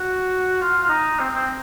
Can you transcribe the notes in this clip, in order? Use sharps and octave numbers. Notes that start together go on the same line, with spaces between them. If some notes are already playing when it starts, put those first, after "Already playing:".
Already playing: F#4
F4
F4
D#4
C4
C4